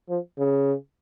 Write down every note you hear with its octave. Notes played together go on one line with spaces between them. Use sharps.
F3
C#3